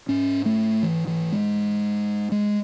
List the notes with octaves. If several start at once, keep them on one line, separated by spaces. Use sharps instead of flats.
G#2 C#4
A3
E3
E3
G#3
G#3